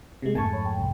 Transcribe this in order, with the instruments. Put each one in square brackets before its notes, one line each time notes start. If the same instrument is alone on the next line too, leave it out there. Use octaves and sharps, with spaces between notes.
[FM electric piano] C3 G#3
[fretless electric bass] F2 G#2 A3 [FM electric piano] G#5 A5 C#6
[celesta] C#5 B5
G5
[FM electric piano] C2